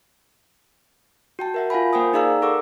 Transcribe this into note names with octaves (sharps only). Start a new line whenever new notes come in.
F#4 G5 A5
A#4 E5 F#5
F4 F5 F#5 G#5 B5
A#3 A#4 C5 G5 G#5 D#6
D#4 G#4 D5 F5 A#5 E6
A4 A#4 F#5 C#6 D6 E6